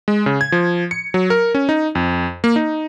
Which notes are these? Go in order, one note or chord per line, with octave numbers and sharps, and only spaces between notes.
G#3
C#3
G#6
F3
C#7
F#3
A#4
C#4
D#4
F2
A#3
D#4